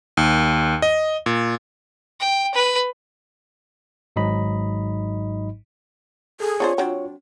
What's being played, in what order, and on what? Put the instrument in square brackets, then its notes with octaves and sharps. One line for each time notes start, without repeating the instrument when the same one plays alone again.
[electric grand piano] D#2
D#5
A#2
[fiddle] G5
B4
[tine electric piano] G#1 G#2 F#3 D#4 D#5 B5
[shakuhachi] G#4 [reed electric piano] A4
[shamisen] C4 D4 C5 [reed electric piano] F4 [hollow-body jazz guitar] C#5
[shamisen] F#3 C4 [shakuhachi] D4